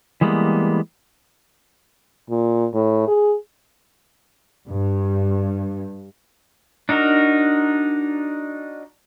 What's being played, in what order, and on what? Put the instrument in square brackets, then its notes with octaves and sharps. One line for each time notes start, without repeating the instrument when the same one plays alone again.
[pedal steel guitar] E3 G3 G#3 A#3 B3
[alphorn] A#2
A2
G#4
[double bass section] G2
[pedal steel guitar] D4 D#4 F#4 A#4